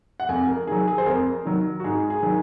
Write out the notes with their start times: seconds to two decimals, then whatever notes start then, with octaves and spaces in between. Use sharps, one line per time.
0.20 F#5
0.29 F2 G#5
0.47 A#4
0.67 D#3 F#3 G#4
0.88 G#4
0.98 C5
1.06 F2 A#4
1.45 D#3 F#3
1.80 F#4
1.84 G#2 G#4
2.10 G#4
2.23 D#3 F#3